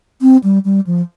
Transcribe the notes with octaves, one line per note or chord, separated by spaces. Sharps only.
C4
G3
G3
F3